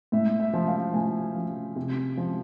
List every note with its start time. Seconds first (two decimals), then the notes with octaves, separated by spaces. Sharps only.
0.12 A2 E5
0.39 E5
0.53 F3
0.68 F5
0.94 A2 G#5
1.36 F3
1.76 C3
2.17 F3